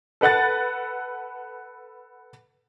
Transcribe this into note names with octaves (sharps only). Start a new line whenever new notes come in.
A4 B4 F#5 F#6 A6